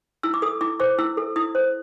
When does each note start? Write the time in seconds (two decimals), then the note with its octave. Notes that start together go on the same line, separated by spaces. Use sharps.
0.23 E4 E6
0.34 D6
0.42 A4 D#6
0.61 E4 D6
0.80 C5 D6
0.99 E4 E6
1.17 A4
1.36 E4 D#6
1.55 C5